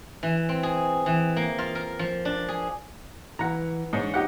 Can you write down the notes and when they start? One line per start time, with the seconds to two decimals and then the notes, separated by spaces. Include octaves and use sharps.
0.23 E3
0.49 C4
0.63 G#4
1.06 E3
1.36 A#3
1.58 F4
1.75 A#4
1.99 F3
2.25 D4
2.48 G#4
3.39 E3 F#5 A#5
3.93 G#2 D4 C#5
4.14 D#4 G4 F#5